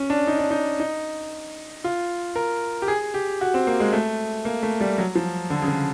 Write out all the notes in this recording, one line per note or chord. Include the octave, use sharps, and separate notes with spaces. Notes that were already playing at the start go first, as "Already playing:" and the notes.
Already playing: C#4
D4
D#4
D4
D#4
D#4
F4
A#4
G4
G#4
G4
F#4
C4
A#3
G#3
A3
A#3
A3
G3
F#3
F3
D3
C#3
D3